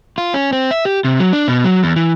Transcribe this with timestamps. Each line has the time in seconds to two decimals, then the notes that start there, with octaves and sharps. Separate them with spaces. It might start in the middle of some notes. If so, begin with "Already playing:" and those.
0.18 F4
0.34 C#4
0.53 C4
0.71 E5
0.85 G4
1.05 C3
1.20 F#3
1.33 D4
1.48 B2
1.64 F#3
1.83 E2
1.96 E3